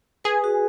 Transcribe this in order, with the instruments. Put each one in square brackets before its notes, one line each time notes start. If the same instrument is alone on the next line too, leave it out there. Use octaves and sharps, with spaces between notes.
[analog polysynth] G#4 [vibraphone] B4
[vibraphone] F#4